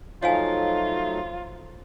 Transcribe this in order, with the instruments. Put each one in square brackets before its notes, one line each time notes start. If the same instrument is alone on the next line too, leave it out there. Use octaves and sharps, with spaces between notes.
[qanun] F3 [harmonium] F#3 A3 D#4 [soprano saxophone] F4 [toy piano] C#5 F5 G#5